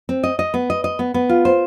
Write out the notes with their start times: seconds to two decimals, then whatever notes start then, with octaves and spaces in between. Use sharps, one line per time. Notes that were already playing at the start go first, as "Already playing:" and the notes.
0.09 C4
0.24 D#5
0.39 D#5
0.54 B3
0.70 D#5
0.84 D#5
0.99 B3
1.14 B3
1.29 F4
1.45 C5